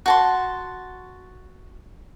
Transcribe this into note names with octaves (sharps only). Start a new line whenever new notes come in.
F#4 A5 C6